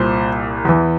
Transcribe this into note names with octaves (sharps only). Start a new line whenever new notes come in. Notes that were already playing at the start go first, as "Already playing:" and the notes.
Already playing: C2 A#2 C5
E2 E3